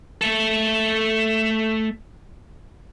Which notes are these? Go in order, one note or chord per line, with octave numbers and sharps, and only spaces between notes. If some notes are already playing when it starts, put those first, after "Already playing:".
A3 A4